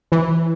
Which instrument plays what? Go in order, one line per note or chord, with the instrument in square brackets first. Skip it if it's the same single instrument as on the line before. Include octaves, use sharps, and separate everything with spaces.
[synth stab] E3